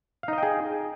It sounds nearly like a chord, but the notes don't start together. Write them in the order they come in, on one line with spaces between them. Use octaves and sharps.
F5 D#4 D#5 G5 G#4